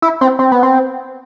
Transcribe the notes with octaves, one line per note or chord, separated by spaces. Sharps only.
E4
C4
C4
B3
C4